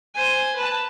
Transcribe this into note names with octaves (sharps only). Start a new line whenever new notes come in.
C5 G#5
B4 A5